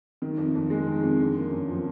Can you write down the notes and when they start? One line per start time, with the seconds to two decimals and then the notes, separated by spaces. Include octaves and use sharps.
0.22 D#3
0.38 F2
0.55 F2
0.70 G#3
0.87 D#3
1.03 F2
1.19 D3
1.36 A#3
1.51 F#2
1.68 F3